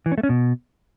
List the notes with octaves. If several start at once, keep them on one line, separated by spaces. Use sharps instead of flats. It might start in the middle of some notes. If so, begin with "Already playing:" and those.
E3
C#4
A3
C#4
B2